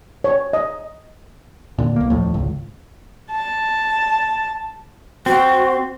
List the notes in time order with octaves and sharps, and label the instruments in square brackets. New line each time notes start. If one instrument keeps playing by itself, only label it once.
[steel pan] C#5
D#5
[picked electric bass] A#2 D3
B1 A#3
D#1 F2 A2
G#1 C#2
[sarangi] A5
[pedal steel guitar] C4 [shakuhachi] F#4